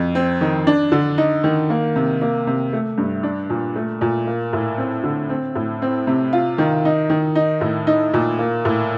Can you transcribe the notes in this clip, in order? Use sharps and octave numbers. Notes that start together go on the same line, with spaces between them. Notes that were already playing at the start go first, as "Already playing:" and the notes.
Already playing: F2
C4
D#3
D4
D3
D#4
D#3
A#3
C3
A#3
C3
A3
G2
D4
A#2
A3
A#2
A#3
A2
C4
D3
C4
A2
C4
C3
F4
D#3
D#4
D#3
D#4
A2
D#4
A#2
A#3
A2